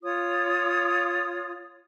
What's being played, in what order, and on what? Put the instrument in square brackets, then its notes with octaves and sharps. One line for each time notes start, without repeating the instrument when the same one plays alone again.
[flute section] F4 C#5 D#6